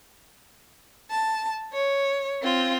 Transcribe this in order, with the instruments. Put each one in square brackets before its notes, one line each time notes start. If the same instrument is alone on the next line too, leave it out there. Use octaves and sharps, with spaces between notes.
[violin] A5
C#5
C4 F4